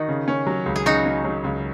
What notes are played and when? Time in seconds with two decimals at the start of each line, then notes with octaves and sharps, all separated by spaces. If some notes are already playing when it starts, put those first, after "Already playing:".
Already playing: D#3 D#4 F#4
0.08 C#3
0.28 C#4
0.47 F#3
0.66 C#2
0.76 G#4
0.85 C#3 D#4 F#4
1.06 C#4
1.24 F#3
1.44 C#2